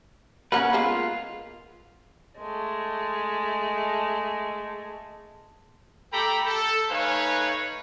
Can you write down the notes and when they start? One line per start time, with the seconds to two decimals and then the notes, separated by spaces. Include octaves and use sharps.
0.52 A#3 C#4 A#4 B4 F#5
0.73 G#3 A#3 B3 F4
2.38 G#3 A3
6.13 A3 G4 A4 G5 A#5 B5
6.47 A4
6.90 A3 D#4 B4 C#5 F5 G#5